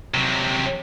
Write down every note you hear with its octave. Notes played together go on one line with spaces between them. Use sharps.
C3 F#3